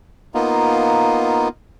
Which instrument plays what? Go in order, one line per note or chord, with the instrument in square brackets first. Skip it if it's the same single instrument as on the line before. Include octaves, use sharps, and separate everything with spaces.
[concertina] A#3 B3 D#4 F4